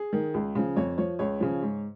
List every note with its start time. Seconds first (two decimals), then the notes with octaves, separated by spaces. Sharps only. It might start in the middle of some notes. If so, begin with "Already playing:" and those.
Already playing: G#4
0.13 D#3
0.34 C#2
0.55 C#3 F3
0.76 F2 C#5
0.98 F3 C#5
1.19 C#2 C#5
1.40 C#3 F3
1.62 G#2